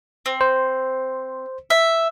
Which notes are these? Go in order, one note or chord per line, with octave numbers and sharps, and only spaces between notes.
C4
C5
E5